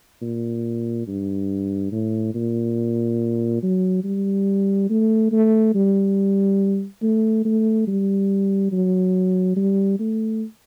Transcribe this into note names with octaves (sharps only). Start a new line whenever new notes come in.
A#2
G2
A2
A#2
F#3
G3
A3
A3
G3
A3
A3
G3
F#3
G3
A3